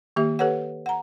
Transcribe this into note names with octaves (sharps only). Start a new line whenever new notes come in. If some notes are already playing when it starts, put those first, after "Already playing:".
D#3 A#3 G4 E5
G4 A4 B4 C#5 F#5
F#5 A#5